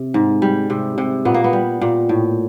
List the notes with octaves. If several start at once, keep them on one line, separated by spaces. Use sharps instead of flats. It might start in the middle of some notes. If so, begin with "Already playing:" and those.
Already playing: C3
G#2
G3
C3
C3
A#2 B3
A#3
B3
G3
A#2
A2